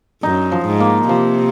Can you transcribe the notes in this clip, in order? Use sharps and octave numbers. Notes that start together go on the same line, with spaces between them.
F#2 D#4
F3
G#2
A#3
C3 F3